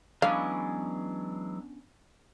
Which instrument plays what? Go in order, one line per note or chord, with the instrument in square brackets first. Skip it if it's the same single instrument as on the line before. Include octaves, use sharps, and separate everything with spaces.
[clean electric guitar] E3 F#3 G#3 [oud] B3 C#4 D4 [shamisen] F5